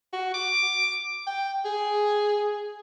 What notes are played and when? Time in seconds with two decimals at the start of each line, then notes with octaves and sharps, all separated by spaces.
0.13 F#4
0.34 D6
1.27 G5
1.65 G#4